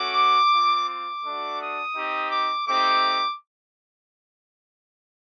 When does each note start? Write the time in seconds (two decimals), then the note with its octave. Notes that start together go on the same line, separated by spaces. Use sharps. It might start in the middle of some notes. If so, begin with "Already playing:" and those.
Already playing: A3 C#4 F#4 D6
0.52 C4 F4
0.89 D6
1.24 A3 D4 F#4
1.61 D#6
1.95 C4 D#4 G4
2.31 D6
2.67 A3 C4 D#4 G4 D6